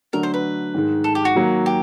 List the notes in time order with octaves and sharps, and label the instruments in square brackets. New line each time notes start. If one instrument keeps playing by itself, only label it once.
[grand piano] D3 F#3 A3 D4 [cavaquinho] A#4
[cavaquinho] C5
B4
[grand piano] G#2 D#3 G#3
[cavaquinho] A4
G4
F#4
[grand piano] D#3 F#3 A#3
[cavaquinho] G4